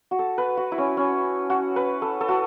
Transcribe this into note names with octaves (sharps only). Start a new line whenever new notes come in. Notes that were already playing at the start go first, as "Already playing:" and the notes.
F#4
A4
B4
F#4
E4
C#4
C#4
F#4
B4
A4
A4
F#4